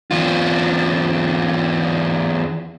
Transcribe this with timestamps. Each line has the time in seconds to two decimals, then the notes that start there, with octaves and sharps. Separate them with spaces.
0.11 E2 F4